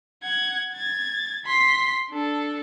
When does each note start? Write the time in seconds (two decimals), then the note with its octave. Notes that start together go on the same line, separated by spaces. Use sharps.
0.23 F#5 G#6
0.72 G#6 A6
1.45 C6 B6
2.10 D4 A4